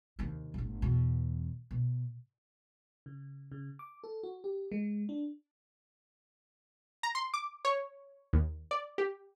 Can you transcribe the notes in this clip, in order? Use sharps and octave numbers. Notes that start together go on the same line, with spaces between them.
D#2 C3
G1 A2
E2 B2
B2
C#3
C#3
D6
A4
F#4
G4
G#3
D4
A#5
C6
D6
C#5
D#2
D5
G4